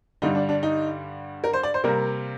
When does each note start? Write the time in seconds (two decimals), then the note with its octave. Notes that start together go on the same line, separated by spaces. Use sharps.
0.22 G2 D3 G3 D#4
0.35 D4
0.49 D4
0.63 D#4
1.44 A#4
1.53 C5
1.63 D5
1.74 C5
1.84 C3 G3 A#3 A#4